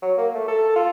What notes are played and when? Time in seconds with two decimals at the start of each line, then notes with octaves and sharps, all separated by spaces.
0.02 F#3
0.18 A#3
0.34 A3
0.48 A4
0.76 F4